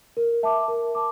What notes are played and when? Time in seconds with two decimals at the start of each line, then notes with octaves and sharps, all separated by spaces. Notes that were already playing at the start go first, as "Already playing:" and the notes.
0.17 A#4
0.43 E5 A5 D6
0.68 A#4
0.95 A5 D6